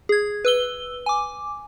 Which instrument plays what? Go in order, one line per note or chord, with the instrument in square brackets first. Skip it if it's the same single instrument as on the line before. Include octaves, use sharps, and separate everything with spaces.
[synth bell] G#4 G#6
B4 E6 G7
G#5 D6